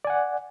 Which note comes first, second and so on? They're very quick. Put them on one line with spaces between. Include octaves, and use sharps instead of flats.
D5 G#5 F#5